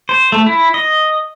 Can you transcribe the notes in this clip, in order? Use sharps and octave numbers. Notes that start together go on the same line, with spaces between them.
C5
A3
E4
D#5